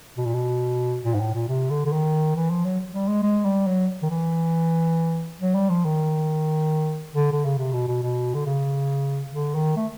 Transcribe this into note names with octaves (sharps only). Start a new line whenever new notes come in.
B2
A#2
B2
A#2
G#2
A2
A#2
C3
D3
D3
D#3
E3
F3
F#3
G3
G#3
G#3
G3
F#3
D#3
E3
F#3
G3
F3
D#3
D3
D3
C#3
C3
B2
B2
B2
D3
C#3
D3
D#3
A3